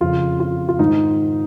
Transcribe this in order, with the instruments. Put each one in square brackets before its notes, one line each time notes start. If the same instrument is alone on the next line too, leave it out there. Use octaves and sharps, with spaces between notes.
[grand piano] F2 C#3 F3 F4
F4
F4
G#2 D#3 D#4